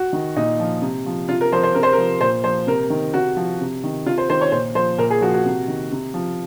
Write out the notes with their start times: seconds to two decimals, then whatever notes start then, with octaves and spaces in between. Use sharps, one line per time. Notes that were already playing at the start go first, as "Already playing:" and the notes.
Already playing: F#4
0.13 D#3
0.36 A#2 D#4
0.60 F3
0.82 C3
1.06 F3
1.29 C3 F4
1.41 A#4
1.52 F3 C5
1.63 C5
1.75 C3 A#4
1.83 C5
1.93 A#4
1.98 F3
2.21 A#2 C5
2.44 F3 C5
2.67 C3 A#4
2.90 D#3
3.14 C3 F#4
3.36 F3
3.60 C3
3.84 D#3
4.06 C3 F4
4.18 C5
4.30 D#3 C5
4.41 C#5
4.52 A#2 C5
4.75 F3 C5
4.98 A#2 A#4
5.10 G#4
5.21 F3 F#4
5.34 F#4
5.45 C3
5.68 D#3
5.92 C3
6.14 F3